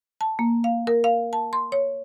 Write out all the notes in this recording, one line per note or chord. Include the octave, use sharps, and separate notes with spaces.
A5
A#3
F5
A#4
F5
A5
C6
C#5